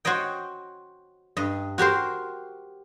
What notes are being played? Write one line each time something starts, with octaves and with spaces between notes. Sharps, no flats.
F#4 C5 C#5 D#5 G5
G2 D#5
F#4 G4 A#4 C5